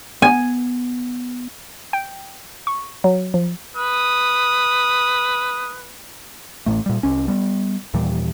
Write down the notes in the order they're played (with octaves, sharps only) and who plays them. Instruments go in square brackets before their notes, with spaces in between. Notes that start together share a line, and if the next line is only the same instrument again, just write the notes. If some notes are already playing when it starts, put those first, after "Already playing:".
[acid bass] B3 [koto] G#5
[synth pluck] G5
C#6
F#3
F3
[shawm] B4 [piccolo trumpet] D#6
[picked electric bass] A1 A2 A3
A#2 G3
C2 C#4
G3 B3
D#2 A#2 E3 G3